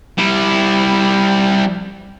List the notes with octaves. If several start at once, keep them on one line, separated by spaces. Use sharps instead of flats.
G3 E4